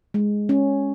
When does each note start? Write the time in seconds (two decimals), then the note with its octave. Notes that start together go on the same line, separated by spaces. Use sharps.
0.14 G#3
0.49 C#4